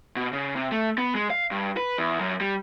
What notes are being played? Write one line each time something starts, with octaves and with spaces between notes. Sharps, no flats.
B2
C#3
C3
A3
B3
G#3
F5
G2
B4
E2
F#2
G3